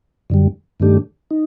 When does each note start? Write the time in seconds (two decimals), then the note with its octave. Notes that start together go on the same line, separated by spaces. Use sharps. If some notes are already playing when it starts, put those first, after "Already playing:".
0.30 F#2 D3 G3
0.80 G2 D#3 A3 D4 G4
1.31 D#4